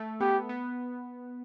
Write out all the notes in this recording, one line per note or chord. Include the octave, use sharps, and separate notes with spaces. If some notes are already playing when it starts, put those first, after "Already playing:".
Already playing: A3
B3 G4
B3